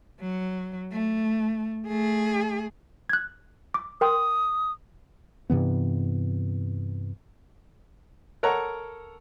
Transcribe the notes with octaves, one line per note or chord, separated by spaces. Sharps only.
F#3
A3
A3 G#4
F#6 G#6
D6
A#4 G5 C6 D#6
G2 C3 E3 B3
A4 A#4 C#5 F#5 A#5